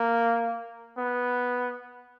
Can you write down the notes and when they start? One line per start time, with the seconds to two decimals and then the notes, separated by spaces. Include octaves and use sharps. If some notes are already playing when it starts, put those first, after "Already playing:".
Already playing: A#3
0.98 B3